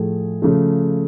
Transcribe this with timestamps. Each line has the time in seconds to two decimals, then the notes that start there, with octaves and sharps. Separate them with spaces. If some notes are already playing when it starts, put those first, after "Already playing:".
Already playing: A2 F3 A3 G#4
0.42 C#3 F3 A3